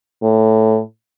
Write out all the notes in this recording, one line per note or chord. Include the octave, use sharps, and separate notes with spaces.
A2